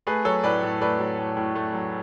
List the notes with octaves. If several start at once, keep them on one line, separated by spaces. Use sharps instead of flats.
A3 G#4 B4
F#3 A4 C#5
A2 B4 D5
A2
A3 B4 D5
F#3
A2
A2
A3
F#3